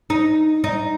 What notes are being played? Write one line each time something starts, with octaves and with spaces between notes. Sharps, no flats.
D#4
D#4